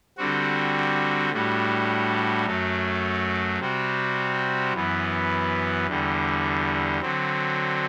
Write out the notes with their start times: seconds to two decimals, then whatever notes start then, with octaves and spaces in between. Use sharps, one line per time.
0.17 D3 G3 C4 F#4
1.32 A2 G3 D4 F#4
2.45 F#2 F#3 A3
3.59 C3 G3 C4 F#4
4.73 F#2 E3 B3
5.86 E2 D3 G3
7.02 D3 F#3 C4